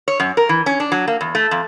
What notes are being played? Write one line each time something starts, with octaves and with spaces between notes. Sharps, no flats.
C#5
F#2
A#4
E3
C#4
D4
F#3
A#3
E2
A3
F2